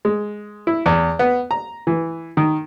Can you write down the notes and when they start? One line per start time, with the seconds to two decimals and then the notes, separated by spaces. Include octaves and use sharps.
0.05 G#3
0.67 E4
0.86 E2
1.19 B3
1.51 A#5
1.87 E3
2.37 D#3